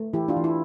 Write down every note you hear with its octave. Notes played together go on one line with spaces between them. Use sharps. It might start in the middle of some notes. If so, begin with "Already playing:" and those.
Already playing: A3
E3 E4 G4
D4 F4
E3
E4